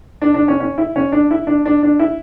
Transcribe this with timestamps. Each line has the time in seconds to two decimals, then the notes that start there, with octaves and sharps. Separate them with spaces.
0.22 D4
0.34 D4
0.48 C#4
0.60 C#4
0.78 E4
0.96 C#4
1.12 D4
1.31 E4
1.47 D4
1.66 D4
1.83 D4
1.99 E4